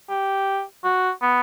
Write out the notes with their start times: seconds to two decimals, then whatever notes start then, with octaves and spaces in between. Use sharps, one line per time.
0.09 G4
0.84 F#4
1.22 B3